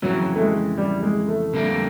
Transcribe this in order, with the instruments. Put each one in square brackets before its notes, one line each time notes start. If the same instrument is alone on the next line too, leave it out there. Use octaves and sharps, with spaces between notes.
[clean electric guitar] F2 C#3 E3 [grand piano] F#3
[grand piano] A3
G#3
G3
G#3
A3
[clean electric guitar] F2 D3 G3 A#3 [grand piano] A3